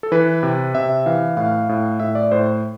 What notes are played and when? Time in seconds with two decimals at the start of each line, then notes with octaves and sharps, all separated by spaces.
0.03 A4
0.12 E3 B4
0.43 C3
0.75 C3 E5
1.06 E3 F5
1.37 A2 F5
1.69 A2
2.00 A2 E5
2.15 D5
2.31 A2 C5